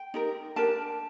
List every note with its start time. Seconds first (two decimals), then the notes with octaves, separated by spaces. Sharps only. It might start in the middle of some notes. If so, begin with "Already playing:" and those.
Already playing: G5
0.14 D#4 G4 A#4
0.56 D4 G4 A#4 A5